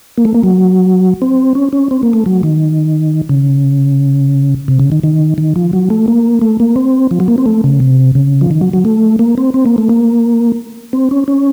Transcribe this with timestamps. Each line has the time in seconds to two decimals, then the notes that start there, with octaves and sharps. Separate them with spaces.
0.18 A#3
0.25 A3
0.35 A#3
0.43 F#3
1.22 C4
1.55 C#4
1.73 C#4
1.91 C4
2.03 A#3
2.13 A3
2.26 F#3
2.43 D#3
3.29 C#3
4.68 C3
4.80 C#3
4.92 D#3
5.03 D#3
5.38 D#3
5.56 F3
5.73 F#3
5.90 A3
6.08 A#3
6.42 A3
6.60 A#3
6.76 C4
7.11 F3
7.20 F#3
7.28 A#3
7.38 C4
7.46 A3
7.64 C#3
7.80 C3
8.15 C#3
8.41 F3
8.51 D#3
8.61 F#3
8.73 F#3
8.85 A3
9.19 A#3
9.38 C4
9.54 C4
9.66 A#3
9.78 A3
9.89 A#3
10.93 C4
11.11 C#4
11.28 C#4